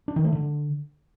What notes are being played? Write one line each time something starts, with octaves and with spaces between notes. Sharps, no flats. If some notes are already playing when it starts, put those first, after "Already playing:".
D4
D#3
A3
D3